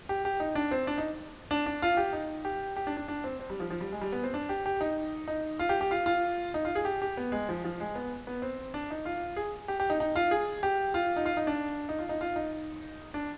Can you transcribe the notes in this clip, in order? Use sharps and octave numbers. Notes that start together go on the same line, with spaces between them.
G4
G4
D#4
D4
C4
D4
D#4
D4
D4
F4
G4
D#4
G4
G4
D4
D4
D4
C4
C4
G3
F3
F3
G3
G#3
G3
B3
C4
D4
G4
G4
D#4
D#4
F4
G4
G4
F4
F4
D#4
F4
G#4
G4
G4
B3
G#3
F3
F3
G#3
B3
B3
C4
D4
D#4
F4
G#4
G4
G4
D#4
D#4
F4
G#4
G4
F4
D#4
F4
D#4
D4
D#4
F4
D#4
F4
D#4
D4